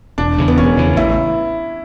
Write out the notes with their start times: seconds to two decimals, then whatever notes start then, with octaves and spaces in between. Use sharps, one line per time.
0.18 E1 D4
0.38 E2 C#3 E3
0.48 B3
0.57 E1 C#4
0.77 E2 C#3 E3
0.96 A1 E4